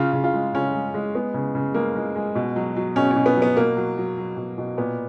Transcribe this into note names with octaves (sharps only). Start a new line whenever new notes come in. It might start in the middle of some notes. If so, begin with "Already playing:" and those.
Already playing: C#3 F4
C#3
F4
G#3
C#3 C#4
G#3
G#3
G#3 B3
C#3
C#3
G#3 A#3
G#3
G#3
B2
F#3
F#3
B2 C#4
C#4
B2
B3
F#3
B3
B2 A#3
F#3
F#3
F#3
B2
B2
A#2 B3